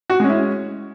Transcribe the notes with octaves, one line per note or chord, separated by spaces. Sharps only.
F#4
G#3 C#4
E4